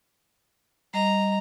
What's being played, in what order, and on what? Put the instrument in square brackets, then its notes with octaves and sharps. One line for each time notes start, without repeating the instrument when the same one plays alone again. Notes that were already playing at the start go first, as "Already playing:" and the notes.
[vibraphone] G3 D#5 [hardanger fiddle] A#5